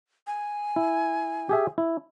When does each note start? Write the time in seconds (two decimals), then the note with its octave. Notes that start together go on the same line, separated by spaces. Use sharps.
0.27 G#5
0.76 E4
1.49 G4 G#4 E5
1.78 E4